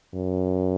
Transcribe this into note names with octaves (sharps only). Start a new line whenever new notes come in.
F#2